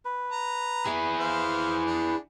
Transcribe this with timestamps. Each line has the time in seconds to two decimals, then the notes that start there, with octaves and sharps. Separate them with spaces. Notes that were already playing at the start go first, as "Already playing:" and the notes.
0.05 B4
0.32 A#5
0.87 E4 G#4
1.20 C5 F5
1.86 D4